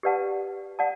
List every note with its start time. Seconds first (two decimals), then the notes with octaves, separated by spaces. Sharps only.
0.03 G4 B4 D5 F#5 A5
0.79 D5 F#5 A5